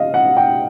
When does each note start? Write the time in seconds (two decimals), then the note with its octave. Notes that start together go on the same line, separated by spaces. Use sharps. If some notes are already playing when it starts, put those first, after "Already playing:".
Already playing: D#5 F5
0.14 F#5
0.37 G5